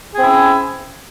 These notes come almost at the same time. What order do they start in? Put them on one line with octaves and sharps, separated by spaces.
G#4 C4 C#4 E4